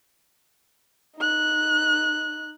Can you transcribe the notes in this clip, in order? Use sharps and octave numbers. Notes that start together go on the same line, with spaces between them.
D#4 F#6